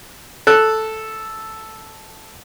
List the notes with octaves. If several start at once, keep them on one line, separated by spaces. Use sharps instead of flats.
A4 F#6